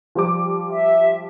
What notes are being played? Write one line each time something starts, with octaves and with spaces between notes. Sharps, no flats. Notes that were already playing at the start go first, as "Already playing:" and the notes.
F3 G3 D6
E5